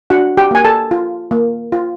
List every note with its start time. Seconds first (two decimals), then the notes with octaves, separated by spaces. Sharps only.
0.10 D4 F#4 F#5
0.37 G4 G5
0.51 A#3 G#5
0.65 A4 A5
0.91 F4
1.31 A#3
1.72 F4